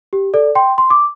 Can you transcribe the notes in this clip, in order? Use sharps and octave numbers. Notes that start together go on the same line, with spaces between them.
G4
A4 D5
G5 C6
C6
D6